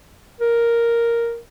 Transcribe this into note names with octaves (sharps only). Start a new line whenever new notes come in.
A#4